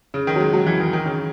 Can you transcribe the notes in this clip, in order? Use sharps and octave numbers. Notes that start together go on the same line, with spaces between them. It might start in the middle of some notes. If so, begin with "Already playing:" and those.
C#3
D#3
F#3
G#3
F#3
E3
D#3
D#3
C#3